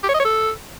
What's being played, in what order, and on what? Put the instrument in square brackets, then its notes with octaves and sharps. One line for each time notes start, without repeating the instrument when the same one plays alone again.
[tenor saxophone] G4
C#5
D#5
C#5
A4